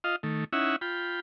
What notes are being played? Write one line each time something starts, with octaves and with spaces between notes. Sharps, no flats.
F4 D#5 F5
D#3 A3
C#4 D#4 E4 E5 F#5
F4 G5 B5